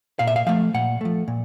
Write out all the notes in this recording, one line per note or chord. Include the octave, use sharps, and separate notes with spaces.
A#2 F5
E5
F5
F3 A3 F5
A#2 F#5
F3 A3
A#2